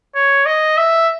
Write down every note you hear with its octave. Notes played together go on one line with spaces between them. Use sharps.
C#5
D#5
E5